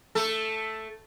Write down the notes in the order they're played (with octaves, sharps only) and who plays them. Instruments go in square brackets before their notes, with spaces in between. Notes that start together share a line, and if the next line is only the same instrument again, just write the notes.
[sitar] A3 A4